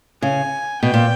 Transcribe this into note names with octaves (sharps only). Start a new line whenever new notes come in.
C#3 G#5
B2 G5
A#2